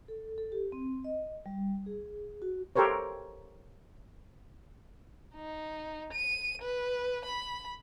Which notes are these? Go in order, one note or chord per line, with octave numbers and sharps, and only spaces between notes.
A4
A4
G4
C4
D#5
G3
G#4
F#4
G4 A4 A#4 C5 C#5
D#4
D#7
B4
B5